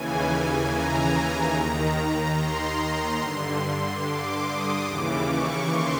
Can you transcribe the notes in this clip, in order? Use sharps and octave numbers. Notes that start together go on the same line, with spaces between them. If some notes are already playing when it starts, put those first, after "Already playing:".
Already playing: D#2 C#3 E3 G#5
A#5
D#2 D#3
C6
G2 D3
D6
D#6
D#2 C#3 E3 D6
C#6
C6